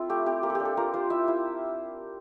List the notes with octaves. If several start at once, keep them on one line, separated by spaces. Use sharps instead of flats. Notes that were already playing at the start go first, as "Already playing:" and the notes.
Already playing: C4 E4 F4 A4
A3 G4
C4 G4
A#3 G4
A4
D4 G4
A4
F4 A#4
F4 C5
E4 E5
E4